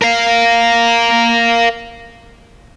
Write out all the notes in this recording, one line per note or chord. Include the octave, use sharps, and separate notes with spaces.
A#4 F5